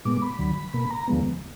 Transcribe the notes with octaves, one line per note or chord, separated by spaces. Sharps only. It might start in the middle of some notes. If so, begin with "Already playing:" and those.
A#2 G#3 B3 D6
B5
D2 D3 F#3
B2 A#3 B5
A#5
D#2 D3 F3 G#3 B3